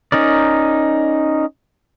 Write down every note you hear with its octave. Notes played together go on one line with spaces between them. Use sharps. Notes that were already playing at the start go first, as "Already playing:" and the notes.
C#4 D#4 A#4 D5